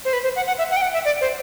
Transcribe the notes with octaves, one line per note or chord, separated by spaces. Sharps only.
C5
B4
C5
F#5
F#5
E5
F#5
G5
F#5
E5
D5
C5